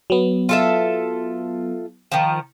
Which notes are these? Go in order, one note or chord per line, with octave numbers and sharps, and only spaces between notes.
F#3 B3
F4 A4 E5
D#3 F3